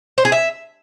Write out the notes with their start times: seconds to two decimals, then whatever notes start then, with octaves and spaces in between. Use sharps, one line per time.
0.18 C5
0.25 G#4
0.32 E5